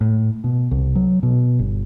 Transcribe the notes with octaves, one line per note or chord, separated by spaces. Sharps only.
A2
B2
C2
F#3
B2
G1